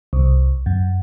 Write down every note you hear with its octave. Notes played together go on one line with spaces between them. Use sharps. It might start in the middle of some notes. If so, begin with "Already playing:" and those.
C2
F#2